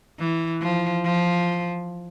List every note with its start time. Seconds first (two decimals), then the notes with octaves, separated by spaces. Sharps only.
0.19 E3
0.61 F3
1.04 F3